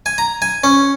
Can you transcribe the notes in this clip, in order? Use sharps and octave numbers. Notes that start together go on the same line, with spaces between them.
G#5
A#5
G#5
C#4